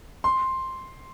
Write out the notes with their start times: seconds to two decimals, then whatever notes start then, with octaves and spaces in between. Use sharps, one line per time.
0.24 C6